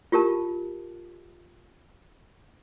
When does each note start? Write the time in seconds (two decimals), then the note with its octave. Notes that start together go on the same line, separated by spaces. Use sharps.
0.12 F4 G4 A#4 A5